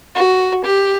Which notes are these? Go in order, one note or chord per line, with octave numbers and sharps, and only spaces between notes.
F#4
G4